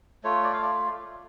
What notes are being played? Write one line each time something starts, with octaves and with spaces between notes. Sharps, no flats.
A3 F4 C#5
D5
F5
D5